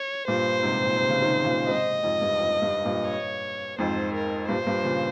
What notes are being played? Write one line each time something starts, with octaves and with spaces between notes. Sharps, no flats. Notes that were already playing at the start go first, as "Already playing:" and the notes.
Already playing: C#5
G2 A#2 C5
G#2 C3
A#2
C3
C#3
C3 D#3
A#2 C#3
G#2 C3 D#5
F2 G#2
G2
F2
G2
G2 A#2
C#5
F2 G#2 C5
A#4
G2 A#2 C5
G2 A#2
A#2 C#3